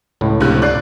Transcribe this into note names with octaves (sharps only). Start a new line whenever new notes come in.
C#2 A2
A#1 C3 F#6
D5 F#6 C7